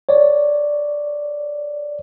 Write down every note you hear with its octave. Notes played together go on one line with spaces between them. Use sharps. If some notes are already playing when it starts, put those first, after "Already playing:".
C#5 D5